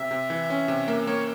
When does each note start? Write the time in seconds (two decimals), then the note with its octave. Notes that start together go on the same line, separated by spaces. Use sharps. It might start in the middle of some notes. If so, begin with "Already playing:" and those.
Already playing: C3 E5
0.11 C3
0.30 E3
0.50 C#4
0.68 C3
0.88 A#3
1.07 A#3 C#5